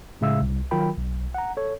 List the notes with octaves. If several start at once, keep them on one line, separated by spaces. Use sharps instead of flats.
A2 C#3 G#3 E5 F5 E6
C2
D#3 F#3 F4 A#4 G5 B5
B1
F#5 A#5
A4 C#5